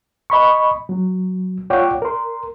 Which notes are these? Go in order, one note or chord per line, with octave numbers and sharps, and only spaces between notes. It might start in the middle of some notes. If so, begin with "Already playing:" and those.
D#5 B5 C#6
F#3
F4 C#5 D5 F#5 G5 D6
A#4 C6